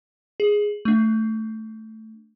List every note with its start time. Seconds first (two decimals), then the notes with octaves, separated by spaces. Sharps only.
0.40 G#4
0.85 A3 D4